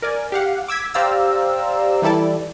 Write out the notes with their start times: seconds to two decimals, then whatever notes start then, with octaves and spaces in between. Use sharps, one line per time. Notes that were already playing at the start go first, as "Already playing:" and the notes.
0.02 A#4 D5 G#5
0.32 G4 F5 F#5
0.68 D6 E6 G#6 B6
0.94 G4 C5 D5 F5 A#5 E6
2.02 E3 G3 E4 A4 D5